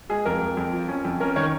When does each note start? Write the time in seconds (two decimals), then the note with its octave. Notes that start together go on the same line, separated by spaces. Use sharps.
0.09 G#3 G#4
0.25 F2 A#4
0.41 F2
0.57 F2
0.73 F3
0.89 C#4
1.05 F2
1.20 C#4 A#4
1.36 D#3 C#5